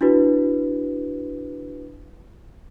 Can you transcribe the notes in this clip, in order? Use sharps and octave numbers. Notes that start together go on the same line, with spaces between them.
D4 E4 F#4 B4